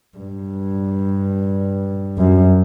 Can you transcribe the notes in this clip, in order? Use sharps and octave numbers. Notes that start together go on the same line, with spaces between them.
G2
F#2